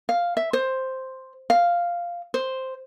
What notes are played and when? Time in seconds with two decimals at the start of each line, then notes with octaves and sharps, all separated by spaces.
0.09 F5
0.37 E5
0.53 C5
1.50 F5
2.34 C5